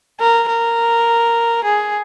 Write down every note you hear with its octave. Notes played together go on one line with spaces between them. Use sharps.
A#4
A#4
G#4